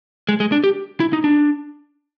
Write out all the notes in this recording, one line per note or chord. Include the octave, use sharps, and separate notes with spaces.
G#3
G#3
D4
G4
E4
D#4
D4